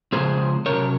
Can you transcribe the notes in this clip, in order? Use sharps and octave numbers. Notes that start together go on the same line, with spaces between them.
C#3 F3 G#3 C4 G#4 C5
C3 F#3 C#4 A#4 C#5